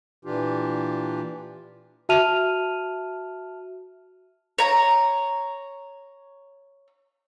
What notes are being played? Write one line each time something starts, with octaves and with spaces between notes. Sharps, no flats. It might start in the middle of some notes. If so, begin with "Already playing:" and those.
A#2 E3 D4 F4 G4
F#4 E5 A5 F6 D#7 F7
C#5 A#5